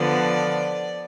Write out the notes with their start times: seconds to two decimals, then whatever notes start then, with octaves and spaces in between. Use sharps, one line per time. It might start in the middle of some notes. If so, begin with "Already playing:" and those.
Already playing: D3 F3 B3 D5